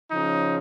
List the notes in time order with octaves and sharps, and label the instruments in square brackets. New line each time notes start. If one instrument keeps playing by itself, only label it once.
[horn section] C#3 F3 C#4 D#4